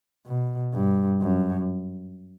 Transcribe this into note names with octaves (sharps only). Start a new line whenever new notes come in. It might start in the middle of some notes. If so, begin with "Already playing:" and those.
B2
G2
F#2